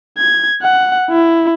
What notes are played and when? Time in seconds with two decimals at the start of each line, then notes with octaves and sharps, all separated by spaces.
0.18 G#6
0.62 F#5
1.10 E4